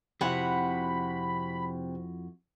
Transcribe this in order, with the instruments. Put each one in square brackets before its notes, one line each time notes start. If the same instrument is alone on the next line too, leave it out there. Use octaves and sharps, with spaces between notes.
[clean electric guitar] F2 E4 F#4 [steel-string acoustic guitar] C3 F#5 [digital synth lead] B5